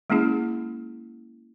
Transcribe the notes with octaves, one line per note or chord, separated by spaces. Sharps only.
G#3 A#3 C#4 E4 G#4